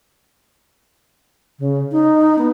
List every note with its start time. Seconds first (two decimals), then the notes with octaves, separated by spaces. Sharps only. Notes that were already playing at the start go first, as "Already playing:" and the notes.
1.59 C#3
1.92 D#4
2.38 B3